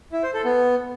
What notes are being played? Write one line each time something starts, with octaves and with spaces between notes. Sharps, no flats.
E4
C5
A4
B3